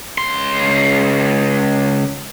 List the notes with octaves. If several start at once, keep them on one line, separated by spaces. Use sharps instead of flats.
C#2 C6